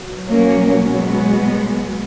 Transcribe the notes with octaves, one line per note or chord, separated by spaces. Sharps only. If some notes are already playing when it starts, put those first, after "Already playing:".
Already playing: B2 F#3
A#3 C#4
G#3 B3